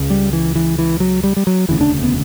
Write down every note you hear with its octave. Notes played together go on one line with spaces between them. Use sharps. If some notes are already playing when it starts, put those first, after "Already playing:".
Already playing: C#2 C#3
G3
E3
E3
E3
F#3
G3
G3
F#3
E1 D2 C#3 E3
D4
B3